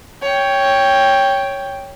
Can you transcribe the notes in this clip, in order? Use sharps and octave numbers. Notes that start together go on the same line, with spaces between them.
C#5 G5